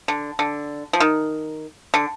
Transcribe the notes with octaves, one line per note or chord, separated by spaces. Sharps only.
D3
D3
F3
D#3
D3